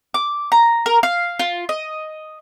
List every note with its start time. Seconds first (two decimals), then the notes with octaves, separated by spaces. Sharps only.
0.14 D6
0.52 A#5
0.86 A#4
1.03 F5
1.39 F4
1.69 D#5